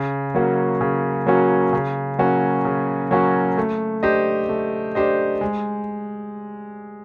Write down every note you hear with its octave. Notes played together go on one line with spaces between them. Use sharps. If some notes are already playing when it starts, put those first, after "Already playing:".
Already playing: C#3
F#3 A#3 C#4 F#4
C#3
F#3 A#3 C#4 F#4
C#3
F#3 A#3 C#4 F#4
C#3
F#3 A#3 C#4 F#4
A3
D4 G4 C5 D#5
A3
D4 G4 C5 D#5
G#3